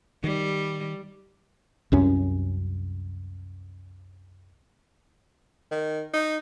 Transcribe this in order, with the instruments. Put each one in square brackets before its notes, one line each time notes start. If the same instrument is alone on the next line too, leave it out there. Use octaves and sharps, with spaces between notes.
[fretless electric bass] D#3 [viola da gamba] G3
[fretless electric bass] C2 F#2 C#4
[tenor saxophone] D#3
D#4